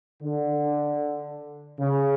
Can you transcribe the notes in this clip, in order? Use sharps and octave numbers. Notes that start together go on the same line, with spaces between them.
D3
C#3